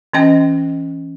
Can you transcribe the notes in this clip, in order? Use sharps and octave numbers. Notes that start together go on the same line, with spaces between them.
E3 C#4 D#5 G5